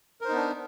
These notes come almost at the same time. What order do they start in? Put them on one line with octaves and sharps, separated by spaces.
A#4 C5 D#4 B3 D4